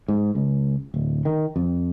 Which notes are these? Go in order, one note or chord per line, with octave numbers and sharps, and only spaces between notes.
G#2
C#2
D1
D#3
F2